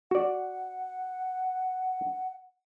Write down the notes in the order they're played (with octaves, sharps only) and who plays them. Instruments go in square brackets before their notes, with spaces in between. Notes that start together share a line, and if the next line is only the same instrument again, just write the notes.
[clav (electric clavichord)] F#4 D5 [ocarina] F#5